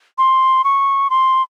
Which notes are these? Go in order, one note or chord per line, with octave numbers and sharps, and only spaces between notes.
C6
C#6
C6